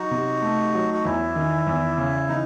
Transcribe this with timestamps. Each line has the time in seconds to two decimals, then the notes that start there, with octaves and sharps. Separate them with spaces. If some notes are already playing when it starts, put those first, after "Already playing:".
Already playing: F#3 D#4 F#4
0.11 C3
0.42 A3
0.74 F#3
0.94 F#4
1.05 E2 E4
1.36 D#3
1.67 E2
1.98 C#3
2.29 E3 D#4